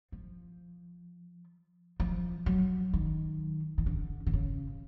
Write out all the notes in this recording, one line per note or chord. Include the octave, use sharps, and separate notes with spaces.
F3
F3
F#3
D#3
D#3
D3
D3
C#3